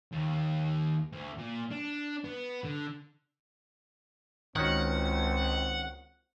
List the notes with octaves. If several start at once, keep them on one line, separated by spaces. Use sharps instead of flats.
D#2
D2
A#2
D4
B3
D3
C#2 D#3 C4 C#4 F#4 F#5